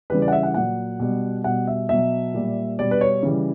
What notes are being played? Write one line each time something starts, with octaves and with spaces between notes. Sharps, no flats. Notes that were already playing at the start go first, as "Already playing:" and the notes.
C#3 E3 G3 B4
D5
F#5
E5
F#5
A#2 F#3 F#5
B2 G3
B2 G3 F#5
E5
B2 F#3 E5
A#2 G3
B2 G3 D5
B4
C#5
C#3 E3 G3